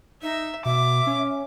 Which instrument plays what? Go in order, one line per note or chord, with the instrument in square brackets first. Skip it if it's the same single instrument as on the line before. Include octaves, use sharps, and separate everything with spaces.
[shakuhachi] D#4 [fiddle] E5
[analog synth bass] B2 [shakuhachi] E5 [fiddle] D6
[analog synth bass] C#4